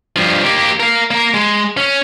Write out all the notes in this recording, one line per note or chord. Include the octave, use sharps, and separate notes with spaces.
G2 F3
A#3 G4
A#4 F5
A#3 A#4
G#3
C#4